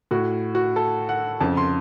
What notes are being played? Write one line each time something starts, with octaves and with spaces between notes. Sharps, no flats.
A2 F#4
F#4
A4
F#5
F2 C#3 A5
C6